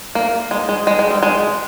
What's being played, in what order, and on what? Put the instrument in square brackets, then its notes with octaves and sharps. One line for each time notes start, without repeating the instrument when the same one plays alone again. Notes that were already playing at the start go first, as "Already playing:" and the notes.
[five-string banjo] A#3
G#3
G#3
G#3
G#3
G3
G#3